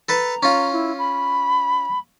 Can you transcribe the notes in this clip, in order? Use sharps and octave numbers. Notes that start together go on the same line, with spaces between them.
A4 B4 A5 A#5
C#4 F4
E4
B5